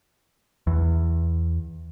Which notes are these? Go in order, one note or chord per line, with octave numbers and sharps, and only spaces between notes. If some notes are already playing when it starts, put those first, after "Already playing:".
E2